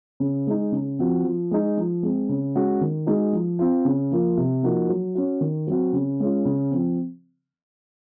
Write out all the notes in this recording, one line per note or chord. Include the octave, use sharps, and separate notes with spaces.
C#3
G#3 D#4
C#3
F3 C4 F#4
F3
G#3 D#4
F3
G#3 C4
C#3
G#3 C#4 F#4
D#3
G#3 D#4 F#4
F3
C4 F4
C#3
F3 A#3 F4
C3
F3 A#3 D#4 F#4
F#3
C#4 F#4
D#3
F#3 C4 F#4
C#3
G#3 C#4 F4
C#3
F3 C4